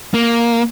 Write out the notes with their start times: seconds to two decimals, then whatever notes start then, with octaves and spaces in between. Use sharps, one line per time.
0.14 A#3